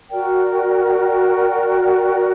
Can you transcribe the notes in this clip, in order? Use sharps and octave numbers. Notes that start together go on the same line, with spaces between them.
F#4 A#4 D5 G5